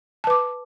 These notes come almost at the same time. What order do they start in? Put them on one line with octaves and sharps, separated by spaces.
A5 B4 D6